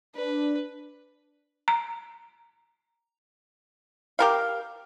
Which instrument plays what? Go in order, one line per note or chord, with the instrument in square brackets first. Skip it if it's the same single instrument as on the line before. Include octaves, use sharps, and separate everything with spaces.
[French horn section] D4 [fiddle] B4
[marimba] A#5
[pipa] G4 A#4 F5